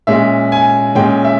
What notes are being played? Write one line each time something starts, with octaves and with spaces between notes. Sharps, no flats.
A#2 G#3 C#4 E5
G#5
A#2 G#3 C#4 G5
E5